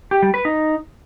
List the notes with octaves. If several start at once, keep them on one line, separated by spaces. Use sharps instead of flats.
G4
G3
B4
D#4